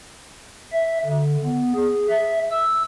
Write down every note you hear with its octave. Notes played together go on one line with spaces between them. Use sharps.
E5
D3
B3
G#4
E5
E6